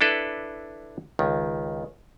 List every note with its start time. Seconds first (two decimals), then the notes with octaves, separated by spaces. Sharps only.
0.01 D4 E4 A4 B4
1.19 C#2 D#3